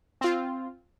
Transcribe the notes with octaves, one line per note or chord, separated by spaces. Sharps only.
C4 F4